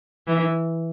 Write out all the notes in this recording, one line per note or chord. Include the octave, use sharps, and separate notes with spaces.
E3